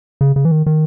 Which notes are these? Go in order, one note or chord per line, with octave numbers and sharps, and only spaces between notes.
C#3
C#3
E3
D#3
D#3